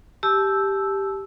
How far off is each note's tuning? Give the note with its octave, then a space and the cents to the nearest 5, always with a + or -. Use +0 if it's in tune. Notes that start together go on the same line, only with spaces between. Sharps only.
G4 +0 A5 -30 E6 +0